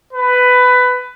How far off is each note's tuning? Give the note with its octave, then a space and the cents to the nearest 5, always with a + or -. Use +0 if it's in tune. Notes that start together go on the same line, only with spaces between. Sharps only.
B4 +15